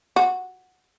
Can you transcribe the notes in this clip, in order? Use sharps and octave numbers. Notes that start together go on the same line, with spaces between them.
F#4